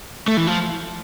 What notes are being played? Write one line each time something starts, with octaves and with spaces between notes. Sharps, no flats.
A3
E3
F3